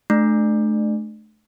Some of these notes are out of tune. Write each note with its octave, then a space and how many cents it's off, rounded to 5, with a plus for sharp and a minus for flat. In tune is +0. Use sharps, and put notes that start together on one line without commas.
A3 -30 D4 +25